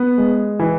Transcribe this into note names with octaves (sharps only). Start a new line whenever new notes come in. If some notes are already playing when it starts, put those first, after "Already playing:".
Already playing: B3
G#3
E3